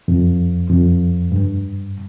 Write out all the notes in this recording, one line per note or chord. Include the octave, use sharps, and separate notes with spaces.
F2
F2
G2